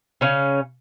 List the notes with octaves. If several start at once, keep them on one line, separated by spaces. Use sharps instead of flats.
C#3 C#4 F5